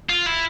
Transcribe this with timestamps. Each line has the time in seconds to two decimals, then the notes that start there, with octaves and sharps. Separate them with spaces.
0.10 F4
0.26 E4